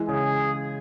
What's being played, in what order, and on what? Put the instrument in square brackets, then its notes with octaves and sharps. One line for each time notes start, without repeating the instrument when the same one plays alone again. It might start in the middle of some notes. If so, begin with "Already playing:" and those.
Already playing: [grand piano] E3 G#3
[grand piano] C#3 [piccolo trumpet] G#4